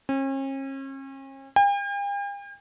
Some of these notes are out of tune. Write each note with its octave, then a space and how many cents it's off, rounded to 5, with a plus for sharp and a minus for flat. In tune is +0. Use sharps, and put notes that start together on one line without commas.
C#4 -40
G5 +45